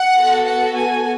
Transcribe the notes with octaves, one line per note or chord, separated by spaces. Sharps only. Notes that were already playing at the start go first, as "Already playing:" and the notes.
Already playing: F#5
B3 F#4 A4
F#5
G#5